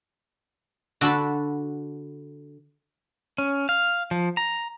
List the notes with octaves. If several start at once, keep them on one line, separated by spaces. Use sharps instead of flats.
D3 F#4 A4 A5 B5
C#4
F5
F3
A#5